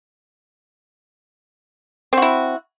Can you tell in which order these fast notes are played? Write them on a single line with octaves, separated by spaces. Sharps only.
C4 F#4 E4